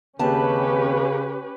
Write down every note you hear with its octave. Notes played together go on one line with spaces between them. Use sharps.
D#2 C#3 C4 C#4 G4 B4 A5